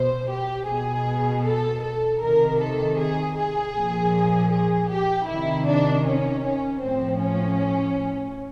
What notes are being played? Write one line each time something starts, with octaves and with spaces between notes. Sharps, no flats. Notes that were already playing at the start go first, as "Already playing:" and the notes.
Already playing: B2 C5
G4
B2 G#4
A4
A4
C3 D#3 A#4
A4
G#4
G#4
A#2 F3
G#4
G4
C3 D#3 E4
D4
C#4
C#4
A2 F3 C4
C#4